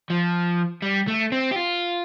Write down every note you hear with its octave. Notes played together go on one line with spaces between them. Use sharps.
F3
G3
A3
C4
G4
F4